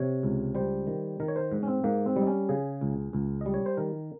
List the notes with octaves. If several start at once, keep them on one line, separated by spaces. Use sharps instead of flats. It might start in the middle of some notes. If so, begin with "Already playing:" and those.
Already playing: C3 C#5
C#2
G3 C5
D#3
D#3 A#4
C#5
C5
G#2
C#4
C4
G#2 A#3
C4
G3
D#4
C#4
C#3 G#4
C#2
C#2
G3 D#5
C#5
C5
D#3 A#4